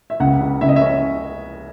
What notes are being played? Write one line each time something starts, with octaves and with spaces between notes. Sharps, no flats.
E5
C#2 F#5
C#3
C#3 E5
D#5
E5
C#4